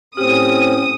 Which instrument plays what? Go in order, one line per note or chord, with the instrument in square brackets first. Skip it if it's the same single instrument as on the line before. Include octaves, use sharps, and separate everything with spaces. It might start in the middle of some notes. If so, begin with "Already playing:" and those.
[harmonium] A2 C4 C#4 [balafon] G4 [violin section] D#6